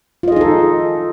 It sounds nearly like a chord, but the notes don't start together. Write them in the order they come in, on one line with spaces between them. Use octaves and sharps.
F4 D#5 G#4 D#4 A4